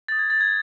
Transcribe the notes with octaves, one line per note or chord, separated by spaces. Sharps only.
D#6 G6 A6
G#6
A6
G#6